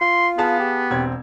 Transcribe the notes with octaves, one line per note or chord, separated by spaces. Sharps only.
F4 C6
B3 G#4 F5 A5
G4
E1 C4 G#6